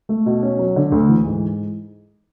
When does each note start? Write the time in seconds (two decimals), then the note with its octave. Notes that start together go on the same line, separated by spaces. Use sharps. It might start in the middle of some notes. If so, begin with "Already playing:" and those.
0.09 A3
0.26 B2
0.43 C#4
0.59 F#3
0.76 D3
0.92 D2
1.09 E3
1.26 G#2